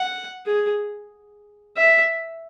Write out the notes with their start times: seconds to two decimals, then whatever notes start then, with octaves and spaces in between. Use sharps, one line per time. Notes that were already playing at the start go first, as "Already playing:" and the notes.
Already playing: F#5
0.46 G#4
1.77 E5